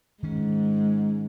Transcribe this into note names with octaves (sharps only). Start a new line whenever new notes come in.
G#2 D#3 C#4